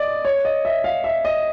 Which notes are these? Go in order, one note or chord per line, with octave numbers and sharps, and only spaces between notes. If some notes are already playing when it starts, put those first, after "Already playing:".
Already playing: D5 D#5
C#5
D#5
E5
F5
E5
D#5